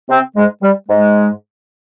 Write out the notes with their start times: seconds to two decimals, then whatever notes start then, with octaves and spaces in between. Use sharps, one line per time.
0.10 C3 C4
0.36 G#2 G#3
0.62 G3
0.88 G#2 G#3